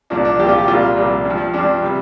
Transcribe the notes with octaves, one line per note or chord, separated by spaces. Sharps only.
C2 A#2 F3 D4
D4
C2 A#2 F3 G4
F4
G4
C2 A#2 G3 F4
C2 A#2 G3
G2 F3
G2 F3 D4
C3 G3